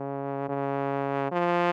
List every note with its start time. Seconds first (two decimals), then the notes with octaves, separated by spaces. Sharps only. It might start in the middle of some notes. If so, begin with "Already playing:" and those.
Already playing: C#3
0.49 C#3
1.31 F3